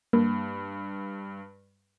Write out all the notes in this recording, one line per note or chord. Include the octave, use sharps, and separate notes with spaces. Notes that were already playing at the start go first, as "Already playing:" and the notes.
G2 A#3